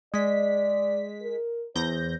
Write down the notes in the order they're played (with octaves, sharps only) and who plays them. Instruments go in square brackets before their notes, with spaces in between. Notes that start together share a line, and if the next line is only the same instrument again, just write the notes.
[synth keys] G#3 B6 [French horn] D5
[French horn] A#4
[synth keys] E2 G6 A#6 [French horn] C5